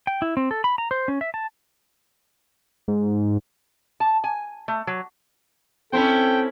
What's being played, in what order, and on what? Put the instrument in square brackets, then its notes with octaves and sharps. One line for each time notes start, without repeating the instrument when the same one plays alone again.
[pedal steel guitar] G5
E4
C4
A4
B5
A#5
C5
C#4
E5
A5
[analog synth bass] G#2
[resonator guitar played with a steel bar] A5
G#5
A3
F#3
[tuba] C4 [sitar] C#4 E4 C5 [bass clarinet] A4 [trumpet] G5